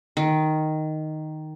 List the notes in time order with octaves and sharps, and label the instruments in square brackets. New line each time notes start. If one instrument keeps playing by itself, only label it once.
[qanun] D#3